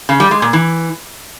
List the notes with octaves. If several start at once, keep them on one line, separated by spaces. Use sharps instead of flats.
C#3
G3
G#3
A#2
E3